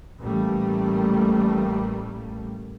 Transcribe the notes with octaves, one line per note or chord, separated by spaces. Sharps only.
A1 G3 A3 A#3